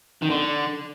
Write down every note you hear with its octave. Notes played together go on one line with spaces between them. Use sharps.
D#3
D3